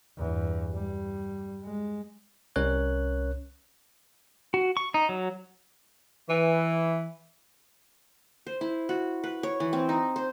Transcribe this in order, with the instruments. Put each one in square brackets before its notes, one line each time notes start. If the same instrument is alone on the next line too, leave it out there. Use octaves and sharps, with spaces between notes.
[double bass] E2 G2
G3
G#3
[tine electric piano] C2 C#4 A#4 C#5 F#6
[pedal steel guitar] F#4
C#6
D#4
F#3
[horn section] E3
[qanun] C5
E4
F#4
B4
C#5
E3
C4
D#4
C5